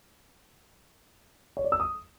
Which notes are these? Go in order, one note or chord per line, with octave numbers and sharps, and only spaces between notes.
C#5
D5
E6
D#6